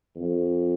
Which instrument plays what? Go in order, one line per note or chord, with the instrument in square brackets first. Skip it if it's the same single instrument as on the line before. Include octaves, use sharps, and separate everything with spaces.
[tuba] F2